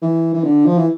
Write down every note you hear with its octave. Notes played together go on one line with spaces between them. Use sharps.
E3
E3
D3
F3
E3